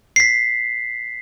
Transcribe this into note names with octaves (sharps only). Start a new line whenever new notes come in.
B6 C7